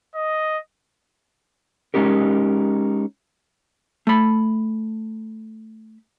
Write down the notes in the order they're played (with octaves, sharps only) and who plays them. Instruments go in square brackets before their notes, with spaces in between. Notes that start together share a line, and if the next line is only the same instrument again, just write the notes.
[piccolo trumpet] D#5
[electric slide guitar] G#3 C#4 D#4 G4 A#4
[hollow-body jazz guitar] A3 B5